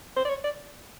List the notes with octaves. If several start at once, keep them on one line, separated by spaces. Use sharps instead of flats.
C5
D5
C#5
D5